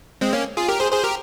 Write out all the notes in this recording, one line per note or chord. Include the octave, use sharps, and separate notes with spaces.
G#3 C4
A#3 C#4
F4 G#4
G4 A#4
G#4 C5
G#4 C5
G4 A#4